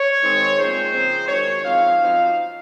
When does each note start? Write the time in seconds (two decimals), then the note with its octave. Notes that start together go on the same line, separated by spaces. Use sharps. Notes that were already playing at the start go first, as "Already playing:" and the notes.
Already playing: C#5
0.23 D#3 G#3 C4 D#4
0.58 A#2 G#3 C4 C5
0.93 C#3 F3 C4 D#4
1.28 F#2 D#3 G#3 C#5
1.64 G#2 F3 C4 D#4 F5
1.99 F#2 F3 C4 D#4